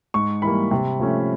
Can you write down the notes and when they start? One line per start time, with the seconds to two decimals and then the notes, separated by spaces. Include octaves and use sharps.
0.14 G#2 C#6
0.42 E3 G3 A#3 B5
0.71 C3
1.00 F3 A3 C#4